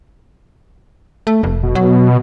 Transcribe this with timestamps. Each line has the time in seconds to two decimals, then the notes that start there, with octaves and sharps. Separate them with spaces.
1.27 A3
1.43 F1
1.63 B2
1.75 F#3